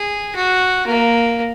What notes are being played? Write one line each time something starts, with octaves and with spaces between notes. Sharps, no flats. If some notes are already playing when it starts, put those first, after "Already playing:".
Already playing: G#4
F#4
A#3